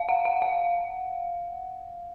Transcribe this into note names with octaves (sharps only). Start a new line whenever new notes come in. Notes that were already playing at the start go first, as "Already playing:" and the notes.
Already playing: F5
F#5
F#5
F5